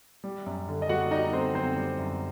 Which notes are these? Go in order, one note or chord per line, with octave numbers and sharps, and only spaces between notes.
G3
F#2
D3
D#5
G3 F#4 F#5
G3 D#4 D#5
D3 C4 C5
F#2 C4 C5
G3
F#2